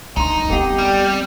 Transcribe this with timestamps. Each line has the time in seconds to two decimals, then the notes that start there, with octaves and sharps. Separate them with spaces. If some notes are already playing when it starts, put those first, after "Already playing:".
0.17 D2 D#4 A#5 C6
0.50 B3 C4 G4 A4 F#5
0.78 G3